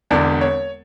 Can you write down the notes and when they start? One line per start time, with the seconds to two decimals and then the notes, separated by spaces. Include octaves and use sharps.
0.10 E1 E2 D3 D5
0.41 C#5